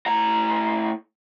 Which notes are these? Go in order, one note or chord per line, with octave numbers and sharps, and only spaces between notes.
A2 A#5